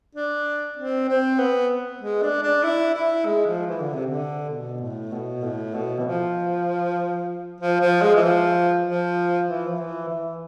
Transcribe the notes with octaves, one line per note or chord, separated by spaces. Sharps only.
D4
C4
C4
B3
G#3
D4
D4
E4
E4
G#3
F3
E3
D3
C3
D3
B2
A2
B2
A2
B2
E3
F3
F3
F3
G#3
E3
F3
F3
E3
F3
E3
E3